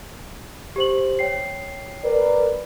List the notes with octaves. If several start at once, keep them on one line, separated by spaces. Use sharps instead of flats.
G4 C5 F#7
C#5 G5 C7
A#4 B4 D5